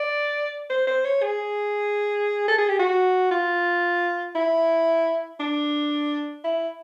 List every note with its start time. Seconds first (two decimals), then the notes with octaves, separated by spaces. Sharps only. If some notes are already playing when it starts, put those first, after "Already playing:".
Already playing: D5
0.70 C5
0.87 C5
1.05 C#5
1.22 G#4
2.48 A4
2.58 G#4
2.69 G4
2.79 F#4
3.31 F4
4.35 E4
5.40 D4
6.44 E4